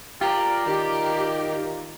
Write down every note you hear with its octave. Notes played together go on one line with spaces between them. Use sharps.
F4 G4 A#4 D5
D#3 G4